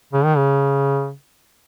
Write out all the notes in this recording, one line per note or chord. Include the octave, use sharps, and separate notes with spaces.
C#3
D#3
C#3